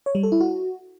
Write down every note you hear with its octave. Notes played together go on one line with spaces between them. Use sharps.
C#5
G3
A4
E4
F#4